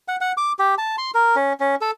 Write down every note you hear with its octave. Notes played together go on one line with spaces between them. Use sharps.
F#5
F#5
D6
G4
A5
C6
A#4
C#4
C#4
A4